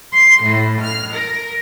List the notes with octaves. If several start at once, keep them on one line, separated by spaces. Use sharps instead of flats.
C6
A2
F6
A#4